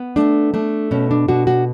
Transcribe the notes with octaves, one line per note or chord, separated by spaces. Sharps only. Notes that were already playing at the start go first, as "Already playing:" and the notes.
Already playing: B3
A3 D4
A3 D4
B2 C#4
D4
B2 D4 F#4
D4 F#4